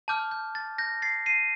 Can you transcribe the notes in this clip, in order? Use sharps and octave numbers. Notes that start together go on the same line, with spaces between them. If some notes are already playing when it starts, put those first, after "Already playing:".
A5 D6 F6 G6
G6
A6
G6 A#6
A6 C7
C7 D#7